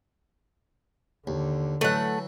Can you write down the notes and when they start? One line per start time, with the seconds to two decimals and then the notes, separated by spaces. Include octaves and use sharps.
1.27 D#2 D3
1.81 E3 F#3 A3 F#5